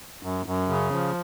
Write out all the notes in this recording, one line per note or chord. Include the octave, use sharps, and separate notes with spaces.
F#2
F#2
C#3
F3